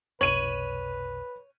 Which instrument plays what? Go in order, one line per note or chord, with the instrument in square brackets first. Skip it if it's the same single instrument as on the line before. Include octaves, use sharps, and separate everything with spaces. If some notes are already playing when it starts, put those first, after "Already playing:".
[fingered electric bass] F1 B1 [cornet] B4 [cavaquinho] C#5 [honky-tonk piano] D#7 F#7